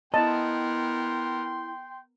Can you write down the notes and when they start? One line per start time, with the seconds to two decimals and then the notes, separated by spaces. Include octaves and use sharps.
0.14 B3 E4 A#4 D#5 G5 A5 C6